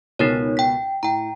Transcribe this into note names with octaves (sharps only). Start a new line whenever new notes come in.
C#2 B2 B3 D#4 A#4 C#5
G5 B6
A2 G5 A#5